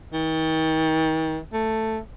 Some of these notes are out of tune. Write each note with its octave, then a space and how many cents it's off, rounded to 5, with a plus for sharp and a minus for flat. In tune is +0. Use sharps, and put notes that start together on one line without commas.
D#3 +40
A3 +5